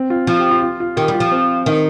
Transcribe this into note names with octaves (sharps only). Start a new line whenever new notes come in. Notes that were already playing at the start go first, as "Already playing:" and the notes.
Already playing: C4
F4
F3 F4
G4
F4
F4
F4
D#3 G4
G3
F4
F3
C4
D#3 D#4